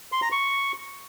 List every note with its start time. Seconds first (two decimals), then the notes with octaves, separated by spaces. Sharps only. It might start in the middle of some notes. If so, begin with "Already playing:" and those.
0.12 C6
0.22 A#5
0.32 C#6